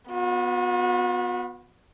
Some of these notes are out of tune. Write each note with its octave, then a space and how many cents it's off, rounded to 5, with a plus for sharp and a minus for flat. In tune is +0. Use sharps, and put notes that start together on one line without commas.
B3 +0 F#4 -45